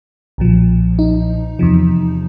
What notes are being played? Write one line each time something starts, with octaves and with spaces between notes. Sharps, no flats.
B1 A#2 F3
D#4
E2 C3 F3